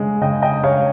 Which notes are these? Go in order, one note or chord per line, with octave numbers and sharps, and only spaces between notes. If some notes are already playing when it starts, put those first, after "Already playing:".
Already playing: C#3 G#3
C#3 D#5 G5
D#5 G5
G#3 C#5 F5